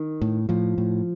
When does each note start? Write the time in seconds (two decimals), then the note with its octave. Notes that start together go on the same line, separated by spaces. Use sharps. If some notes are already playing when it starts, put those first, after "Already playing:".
Already playing: D#3
0.21 A2
0.49 A2 F3
0.78 A2